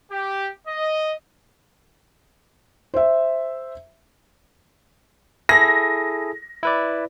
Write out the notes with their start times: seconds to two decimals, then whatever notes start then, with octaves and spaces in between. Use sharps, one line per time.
0.11 G4
0.68 D#5
2.94 C5 E5
5.49 E4 G#4 A4 A#6
6.63 E4 B4 D5